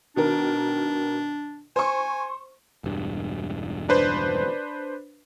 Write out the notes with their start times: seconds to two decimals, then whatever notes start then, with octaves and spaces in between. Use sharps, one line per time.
0.16 B2 D#3 D4 A#4
1.76 C5 G#5 C#6
2.84 E1 G2
3.89 D4 B4 C5